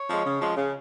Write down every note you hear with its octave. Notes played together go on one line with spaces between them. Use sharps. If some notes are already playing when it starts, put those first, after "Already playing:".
Already playing: C#5
F3 G#3
C#3
F3 G#3
C#3